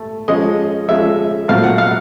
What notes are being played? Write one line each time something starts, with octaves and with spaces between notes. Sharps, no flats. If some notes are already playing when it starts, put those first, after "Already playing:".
Already playing: A3
F3 G#3 C#4 D#5
F3 G#3 C#4 E5
A#2 F#3 A3 C4 F5
F#5
F5